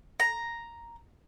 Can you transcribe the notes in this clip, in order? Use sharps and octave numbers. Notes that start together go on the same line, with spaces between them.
A#5